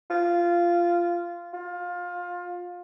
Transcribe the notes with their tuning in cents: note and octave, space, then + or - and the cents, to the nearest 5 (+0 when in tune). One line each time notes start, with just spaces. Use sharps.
F4 -10
F4 +20